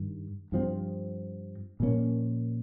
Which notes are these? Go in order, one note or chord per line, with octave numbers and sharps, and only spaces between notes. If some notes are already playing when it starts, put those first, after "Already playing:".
Already playing: G2 D#3
G2 F3 C4
A#2 F3 A#3 C#4